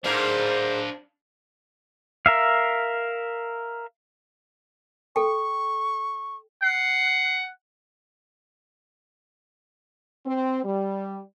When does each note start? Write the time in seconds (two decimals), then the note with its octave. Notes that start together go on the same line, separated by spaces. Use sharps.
0.04 G#2 D4 A#4 C5 F5
2.26 A#4 E5 F5
5.16 A4 G5 C#6
6.63 F#5 C7
10.26 C4
10.64 G3